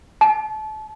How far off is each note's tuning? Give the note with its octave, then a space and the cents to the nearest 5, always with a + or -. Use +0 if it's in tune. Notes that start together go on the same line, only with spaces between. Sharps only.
A5 -30